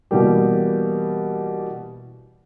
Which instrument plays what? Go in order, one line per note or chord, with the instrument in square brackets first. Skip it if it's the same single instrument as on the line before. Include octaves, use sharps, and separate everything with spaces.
[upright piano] B2 E3 G3 A#3 G4